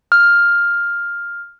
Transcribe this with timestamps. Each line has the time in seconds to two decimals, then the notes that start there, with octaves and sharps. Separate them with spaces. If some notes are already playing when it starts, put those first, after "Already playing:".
0.12 F6